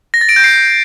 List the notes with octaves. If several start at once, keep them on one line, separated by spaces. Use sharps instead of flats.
A#6
A6
D7
G6
C7